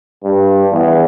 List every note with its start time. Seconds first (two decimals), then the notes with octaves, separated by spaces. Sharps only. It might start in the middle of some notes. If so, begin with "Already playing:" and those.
0.24 G2
0.71 E2